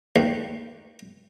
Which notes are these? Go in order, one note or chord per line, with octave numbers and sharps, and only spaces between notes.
D#2